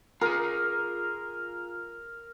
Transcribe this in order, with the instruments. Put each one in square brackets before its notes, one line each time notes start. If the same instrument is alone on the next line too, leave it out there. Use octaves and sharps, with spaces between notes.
[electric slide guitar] F4 G#4 [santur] A#4